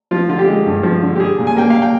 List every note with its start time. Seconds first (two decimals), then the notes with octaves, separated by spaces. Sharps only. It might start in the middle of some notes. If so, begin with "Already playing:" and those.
0.11 F3 F4
0.29 D3 F4
0.38 G4
0.47 G#3
0.66 G2
0.83 F3
1.02 D3
1.16 G4
1.20 G3 G#4
1.38 A#2
1.47 G#5
1.57 A#3 G5
1.70 F5
1.82 G5